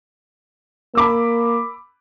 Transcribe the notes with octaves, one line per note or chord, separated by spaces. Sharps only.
A#3 B5 D6 E6